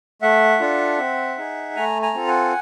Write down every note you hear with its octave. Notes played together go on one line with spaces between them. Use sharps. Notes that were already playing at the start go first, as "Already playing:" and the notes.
A3 E5 F#5
D4 F4 A4
C4
D#4 G#4
A3 G#5 A#5
G#5 A#5
C4 F4 A4
F#5 G#5